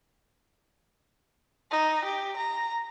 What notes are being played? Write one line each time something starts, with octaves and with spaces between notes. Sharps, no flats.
D#4
G4
A#5